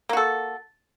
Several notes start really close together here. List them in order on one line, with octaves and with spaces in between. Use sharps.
A#3 F#4 A4